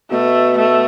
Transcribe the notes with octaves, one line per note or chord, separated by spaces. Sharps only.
B2 A3
A3